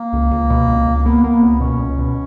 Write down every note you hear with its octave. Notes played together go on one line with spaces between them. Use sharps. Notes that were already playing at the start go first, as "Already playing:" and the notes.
Already playing: A#3
C#2
C#2
B2
C#2
C#2
A#3
A#3 B3
A#3 B3
C#2 B3
B2 C#4
C#2
B2